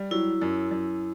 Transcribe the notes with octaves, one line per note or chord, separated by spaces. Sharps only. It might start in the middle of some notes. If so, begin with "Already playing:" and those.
Already playing: G3
F#3 E4
F#2
F#2